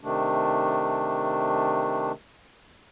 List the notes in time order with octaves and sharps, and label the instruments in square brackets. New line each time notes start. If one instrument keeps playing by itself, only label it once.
[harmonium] C3 D#3 A3 D4